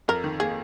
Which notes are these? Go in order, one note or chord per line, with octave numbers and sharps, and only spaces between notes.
F2 A#4
D#3
A#3 G#4